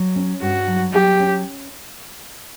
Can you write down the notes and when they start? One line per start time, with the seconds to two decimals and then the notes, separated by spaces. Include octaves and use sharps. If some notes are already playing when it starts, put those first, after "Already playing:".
Already playing: F#3
0.16 C#4
0.42 G2 F#4
0.68 F#3
0.93 F#3 G4
1.20 C#4